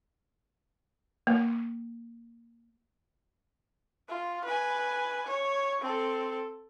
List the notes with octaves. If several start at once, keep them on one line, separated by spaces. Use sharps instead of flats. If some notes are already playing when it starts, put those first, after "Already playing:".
A#3
F4
B4 G#5
C#5
C4 A4